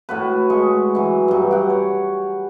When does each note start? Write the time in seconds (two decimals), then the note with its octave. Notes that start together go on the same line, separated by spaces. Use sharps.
0.09 A2 F#4 B4
0.50 G#3 C#6
0.95 E3 F#3
1.28 G2 F#3
1.51 F#5 G5
1.70 C#5